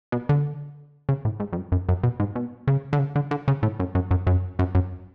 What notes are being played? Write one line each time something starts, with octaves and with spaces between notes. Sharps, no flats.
B2
D3
C#3
A2
G#2
F2
F#2
F#2
F#2
B2
G#2
B2
C#3
D3
C#3
D3
D3
C#3
A2
F#2
F#2
F#2
F#2
F#2
F#2